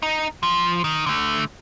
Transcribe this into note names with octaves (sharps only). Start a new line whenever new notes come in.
D#4
F3
D#3
D3 A3